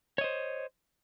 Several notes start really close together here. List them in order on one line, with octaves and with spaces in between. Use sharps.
C#5 D#5 C5